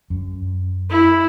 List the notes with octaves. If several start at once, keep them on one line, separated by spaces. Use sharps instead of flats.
F#2
E4